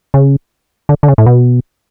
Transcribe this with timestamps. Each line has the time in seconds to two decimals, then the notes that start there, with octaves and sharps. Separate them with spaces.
0.14 C#3
0.89 D3
1.03 D3
1.08 C#3
1.18 A2
1.26 B2